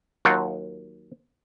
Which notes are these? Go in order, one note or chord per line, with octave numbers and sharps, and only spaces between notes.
D#2 F#3 F4 F#5 G5